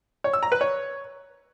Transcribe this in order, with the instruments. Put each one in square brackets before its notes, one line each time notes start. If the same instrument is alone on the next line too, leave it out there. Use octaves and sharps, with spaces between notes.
[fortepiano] C#5
E6
A#5
B4
C#5